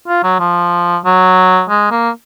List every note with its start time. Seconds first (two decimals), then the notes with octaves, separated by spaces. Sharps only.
0.08 F4
0.24 F#3
0.40 F3
1.05 F#3
1.69 G#3
1.91 A#3